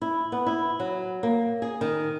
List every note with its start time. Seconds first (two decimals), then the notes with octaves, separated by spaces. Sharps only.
0.02 E4
0.32 B3
0.46 E4
0.80 F#3
1.23 A#3
1.62 G#4
1.81 D#3